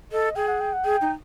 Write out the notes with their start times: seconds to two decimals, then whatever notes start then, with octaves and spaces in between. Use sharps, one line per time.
0.12 A4 D#5
0.36 G#4 G5
0.48 F#5
0.61 G5
0.73 F#5
0.85 G#4 G5
1.01 D#4